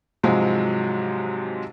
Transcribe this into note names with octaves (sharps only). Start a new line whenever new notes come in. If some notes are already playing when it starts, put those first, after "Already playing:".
G#2 C3 F3 F#3 G#3